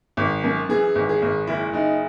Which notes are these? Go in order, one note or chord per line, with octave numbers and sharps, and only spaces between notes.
G#1
F#2
E3 G#4
G#1
G#4
G#1
F#1 E4
F#1 D#4